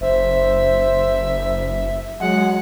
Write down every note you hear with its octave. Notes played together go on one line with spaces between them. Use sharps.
F#1 C5 E5
F#3 G#3 F#5